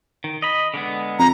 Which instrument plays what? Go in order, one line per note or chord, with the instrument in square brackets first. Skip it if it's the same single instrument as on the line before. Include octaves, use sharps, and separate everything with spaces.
[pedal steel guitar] D#3
D#5 B5
D3 G#3 B3
[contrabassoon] F2 [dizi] A#5